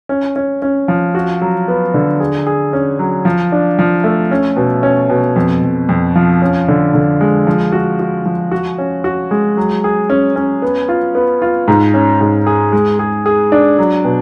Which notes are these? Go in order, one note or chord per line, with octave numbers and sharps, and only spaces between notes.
C#4
C#4
C#4
F3
F#4
F#3
B3
D3
G#4
G#4
C#4
F#3
F3
D4
F3
A3
C#4
B2
C#4
B2
F2
F2
F2
F3
C#4
D3
D3
G#3
F3
F#4
F#4
F3
F#4
C#4
F#4
G#3
F#3
G#4
C#4
C#4
B3
F4
B3
F4
G#2
C#4
G#2
G#4
G#3
G#4
G#4
D4
F#3
B2